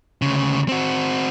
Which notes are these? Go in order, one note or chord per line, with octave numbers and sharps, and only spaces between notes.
D2 C#3
C4 F#4